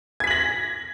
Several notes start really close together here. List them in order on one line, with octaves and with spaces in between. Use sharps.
G#6 B6 F#7 A#6